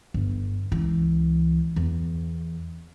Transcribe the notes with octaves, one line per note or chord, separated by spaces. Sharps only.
G1
C#2 E3
E2